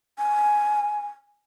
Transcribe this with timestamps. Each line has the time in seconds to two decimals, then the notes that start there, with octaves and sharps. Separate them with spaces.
0.18 G#5